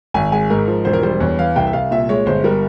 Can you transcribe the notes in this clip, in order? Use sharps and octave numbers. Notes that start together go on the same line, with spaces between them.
G#1 G#5
G#3 G#5
G#2 A#4
F3
E1 C5
A#4
G3 C5
E2 C#5
E3 F5
C2 G5
E5
C2 F5
A#2 E5
G#3 C#5
G1 C5
G3 A#4